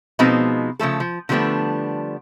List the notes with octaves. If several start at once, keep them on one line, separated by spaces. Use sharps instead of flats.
B2 F3 G#3 B3 C4 D#4
C#3 F3 A3 A4
F3
D3 F3 G3 A3 B3 D4